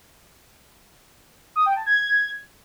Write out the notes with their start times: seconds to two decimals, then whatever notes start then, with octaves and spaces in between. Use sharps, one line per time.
1.56 D#6
1.66 G5
1.76 A5
1.86 G#6